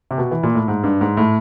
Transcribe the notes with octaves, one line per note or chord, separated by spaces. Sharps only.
C3
B2
E3
A#2
A2
G#2
G2
G#2
A2